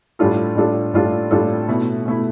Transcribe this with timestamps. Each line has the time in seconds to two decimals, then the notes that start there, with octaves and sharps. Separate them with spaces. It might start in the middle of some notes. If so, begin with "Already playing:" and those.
0.19 A2 G3 D4 F4 A4
0.56 A2 G3 D4 F4 A4
0.94 A2 G3 D4 F4 A4
1.31 A2 G3 D4 F4 A4
1.68 B2 A3 E4
2.06 B2 A3 E4